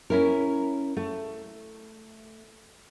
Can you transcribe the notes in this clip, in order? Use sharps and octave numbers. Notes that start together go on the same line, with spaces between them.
C#4 E4 A#4
A3